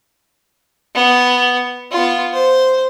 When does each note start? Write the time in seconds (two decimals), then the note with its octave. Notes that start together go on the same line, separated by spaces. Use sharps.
0.95 B3
1.92 B3 F4
2.33 C5